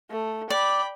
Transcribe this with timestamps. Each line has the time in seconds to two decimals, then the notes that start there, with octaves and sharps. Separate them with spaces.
0.10 A3
0.50 D5 G5 B5